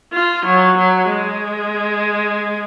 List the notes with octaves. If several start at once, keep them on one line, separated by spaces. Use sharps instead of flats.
F4
F#3
F#3
G#3